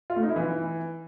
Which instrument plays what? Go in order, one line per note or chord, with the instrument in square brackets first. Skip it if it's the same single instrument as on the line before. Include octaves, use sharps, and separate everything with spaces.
[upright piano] F4
A3
D#4
E4
E3